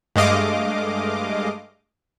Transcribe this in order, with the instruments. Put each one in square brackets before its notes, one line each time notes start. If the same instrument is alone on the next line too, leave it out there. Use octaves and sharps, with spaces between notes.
[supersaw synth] G2 G#3 A3 D#5 F5 D6